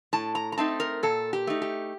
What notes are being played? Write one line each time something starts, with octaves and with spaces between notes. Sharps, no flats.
A2 A5
A#5
A#5
A3 C4 D#4 A5
A#4
A#2 A4
G4
A3 D#4
G4